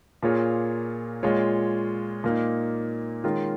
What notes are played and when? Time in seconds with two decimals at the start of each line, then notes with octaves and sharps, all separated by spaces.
0.22 A#2 A#3 F4 G#4 C#5
1.23 A#2 G#3 F4 C#5
2.24 A#2 A#3 D#4
3.24 D#3 G#3 C#4 F4 A#4